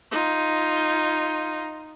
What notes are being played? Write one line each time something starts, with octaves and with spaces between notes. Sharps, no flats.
D#4 F4